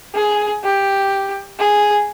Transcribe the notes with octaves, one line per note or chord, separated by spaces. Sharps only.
G#4
G4
G#4